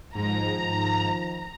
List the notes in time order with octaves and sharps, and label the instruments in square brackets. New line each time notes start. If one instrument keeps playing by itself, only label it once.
[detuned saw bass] G#2 [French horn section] D#3 F3 [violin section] A#5